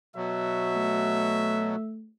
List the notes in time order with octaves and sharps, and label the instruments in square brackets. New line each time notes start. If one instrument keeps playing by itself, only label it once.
[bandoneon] B2 F#3 [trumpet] E5
[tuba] A3